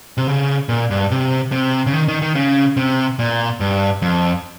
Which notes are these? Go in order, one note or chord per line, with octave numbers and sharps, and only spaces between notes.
C3
C#3
A#2
G2
C3
C3
C#3
D#3
D#3
D#3
C#3
C3
A#2
G2
F2